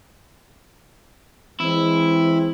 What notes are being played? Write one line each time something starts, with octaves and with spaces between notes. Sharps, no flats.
E3 G#3 C4 E4